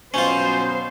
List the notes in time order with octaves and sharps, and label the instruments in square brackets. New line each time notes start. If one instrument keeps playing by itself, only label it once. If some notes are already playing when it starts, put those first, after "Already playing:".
[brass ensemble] B2 F#3 [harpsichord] C#4 F4 [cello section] C5